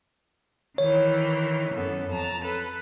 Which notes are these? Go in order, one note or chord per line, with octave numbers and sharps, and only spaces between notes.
D#3 E3 C#5
F#2 B3 A4
F2 A5 A#5
A4 B4